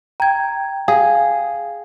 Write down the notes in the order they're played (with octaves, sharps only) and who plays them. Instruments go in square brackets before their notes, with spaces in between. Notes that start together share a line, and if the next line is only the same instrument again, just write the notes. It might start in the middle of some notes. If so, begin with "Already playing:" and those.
[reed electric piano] G5 [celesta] A#5 G#6
[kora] G#4 [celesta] F5